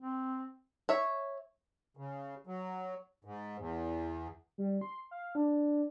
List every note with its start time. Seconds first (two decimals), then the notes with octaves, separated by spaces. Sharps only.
0.01 C4
0.89 C#5 E5
1.97 C#3
2.47 F#3
3.25 G#2
3.58 E2
4.58 G3
4.81 C6
5.11 F5
5.35 D4